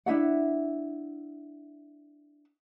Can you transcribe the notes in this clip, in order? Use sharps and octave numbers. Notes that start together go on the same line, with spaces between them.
D4 E4 E5 F#5